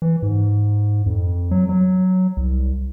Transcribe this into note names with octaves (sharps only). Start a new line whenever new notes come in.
E3
G#2
F2
F#3
F#3
C2